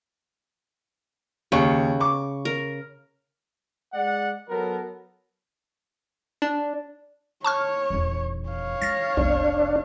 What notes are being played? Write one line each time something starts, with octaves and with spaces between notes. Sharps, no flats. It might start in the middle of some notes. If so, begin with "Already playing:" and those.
D#2 C#3 C#6
C#6 D6
A#4
G#3 D5 F#5
F#3 B3 A4 A#4
D4
C#5 A5 C#6 F6
D#1 E2
C#5 F5
E3 A6 A#6
F1 B1 C3 D4